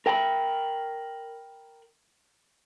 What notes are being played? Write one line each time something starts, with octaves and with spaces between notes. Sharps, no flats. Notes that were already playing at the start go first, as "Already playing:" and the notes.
A#4 G5 A5 B5